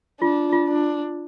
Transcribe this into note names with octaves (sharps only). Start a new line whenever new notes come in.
D4 F4
F4
D4